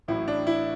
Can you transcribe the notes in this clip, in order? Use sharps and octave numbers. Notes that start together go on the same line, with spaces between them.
A1 A2 F#3 E4
D4
E4